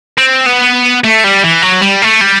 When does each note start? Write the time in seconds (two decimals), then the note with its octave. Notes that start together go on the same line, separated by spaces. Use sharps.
0.18 C4
0.46 B3
1.04 A3
1.24 G3
1.44 E3
1.62 F#3
1.81 G3
2.02 A3
2.21 G3